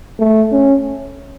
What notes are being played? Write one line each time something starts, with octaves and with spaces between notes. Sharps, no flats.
A3
C#4